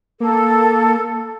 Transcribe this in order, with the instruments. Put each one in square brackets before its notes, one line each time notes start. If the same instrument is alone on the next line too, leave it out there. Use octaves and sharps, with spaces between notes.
[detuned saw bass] A#3 [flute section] A4